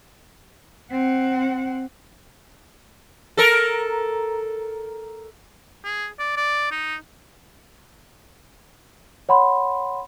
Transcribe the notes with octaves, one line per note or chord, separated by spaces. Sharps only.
C4 F#5
A4 A#4
G#4
D5
D5
D#4
C#5 F#5 B5 C6